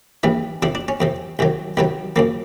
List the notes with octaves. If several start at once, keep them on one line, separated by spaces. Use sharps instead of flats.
A#1 G#2 E3 G3
F2 C3 F3 D4
D4
C#4
F2 C3 F3
C2 C3 D#3 F#3
C2 C3 D#3 F#3 G3
F#2 C#3 F3 A#3